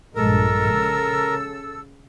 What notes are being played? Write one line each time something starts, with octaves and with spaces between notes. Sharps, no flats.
A#1 G2 G#3 A4 A#4 E6
C#3